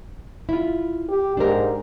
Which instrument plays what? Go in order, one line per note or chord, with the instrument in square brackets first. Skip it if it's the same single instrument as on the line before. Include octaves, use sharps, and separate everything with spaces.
[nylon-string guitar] E4 F4
[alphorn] G4
[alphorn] G#2 [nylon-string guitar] D4 G4 A#4